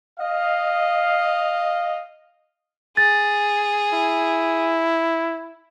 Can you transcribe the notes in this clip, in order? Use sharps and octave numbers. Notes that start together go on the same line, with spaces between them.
D#5 F5
G#4 A6
E4